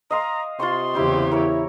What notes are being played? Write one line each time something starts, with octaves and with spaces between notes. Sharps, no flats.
D#5 F5 A#5 C6
C3 F4 C6 C#6
E2 C#3 E4 G4 C5
E4 A#4 C#5